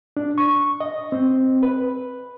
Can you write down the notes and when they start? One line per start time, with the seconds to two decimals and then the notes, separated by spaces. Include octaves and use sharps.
0.17 D4
0.38 C#6
0.80 D#5
1.12 C4
1.63 B4